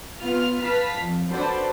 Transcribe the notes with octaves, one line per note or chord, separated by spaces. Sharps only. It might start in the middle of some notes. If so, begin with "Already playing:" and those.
B3 F4 F6
B4 F5 A5 F6 B6
F2
D4 F#4 A4 B4 C5 D5